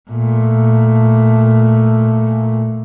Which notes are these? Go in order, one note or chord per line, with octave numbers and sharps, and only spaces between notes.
A#2 A3